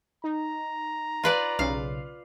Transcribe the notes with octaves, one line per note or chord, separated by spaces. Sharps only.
D#4 A#5
F4 B4 D5
B1 C#3 F5